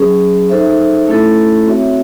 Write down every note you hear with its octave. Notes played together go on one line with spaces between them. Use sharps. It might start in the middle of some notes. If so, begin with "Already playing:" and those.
Already playing: F#3 C#4 G#4
D#4 A4 C5 E5
A3 C#4 E4 A4
C4 F#4 C#5 E5